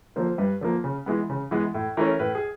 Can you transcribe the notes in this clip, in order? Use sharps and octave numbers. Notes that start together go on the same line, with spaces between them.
D3 F3 A#3 C5
G2 B4
D3 F3 A#3
C#3
E3 G#3 B3
C#3
E3 G#3 B3
A2
E3 A3 C#4 A#4
A2 B4
G#4